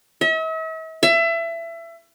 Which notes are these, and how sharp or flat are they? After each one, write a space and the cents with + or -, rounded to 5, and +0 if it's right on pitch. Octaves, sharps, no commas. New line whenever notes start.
E5 -45
E5 +25